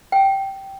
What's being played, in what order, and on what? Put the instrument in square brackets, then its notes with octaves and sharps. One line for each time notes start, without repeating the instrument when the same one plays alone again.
[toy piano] G5